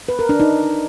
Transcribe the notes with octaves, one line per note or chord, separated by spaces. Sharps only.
B4
A#4
D4
D#4